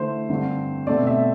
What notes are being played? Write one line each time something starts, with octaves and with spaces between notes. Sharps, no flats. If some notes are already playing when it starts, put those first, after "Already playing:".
Already playing: D3 A3 E4 C5
G2 D3 G3 C4
B2 A3 C4 D5
E5